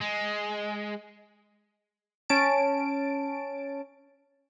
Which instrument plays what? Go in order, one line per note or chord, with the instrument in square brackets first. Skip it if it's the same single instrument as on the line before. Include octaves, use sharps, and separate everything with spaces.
[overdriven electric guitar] G#3
[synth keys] C#4 A5 D7